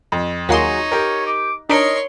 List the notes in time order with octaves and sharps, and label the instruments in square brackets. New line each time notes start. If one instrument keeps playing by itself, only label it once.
[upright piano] F2
[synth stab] D#2 A#3 C6 [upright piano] F#3 F#4 G#4 [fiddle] D#4 [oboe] C#5
[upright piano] G4 A#4
[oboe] D6
[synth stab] D4 D#4 [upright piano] A#4 D7 [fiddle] C#5 C6 [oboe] D#5